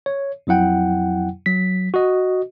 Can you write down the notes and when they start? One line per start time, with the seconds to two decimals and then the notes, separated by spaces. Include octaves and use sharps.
0.06 C#5
0.47 F2 F#3 E4 F#5 G5
1.46 F#3 B6
1.94 F#4 D#5